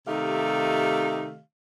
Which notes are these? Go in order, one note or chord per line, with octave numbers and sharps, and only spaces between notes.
C3 D#3 A3 D#4 G4 F5